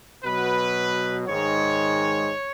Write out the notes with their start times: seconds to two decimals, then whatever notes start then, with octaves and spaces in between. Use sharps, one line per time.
0.24 B2 F#3 B4
1.27 G#2 D#3 G#3 C#5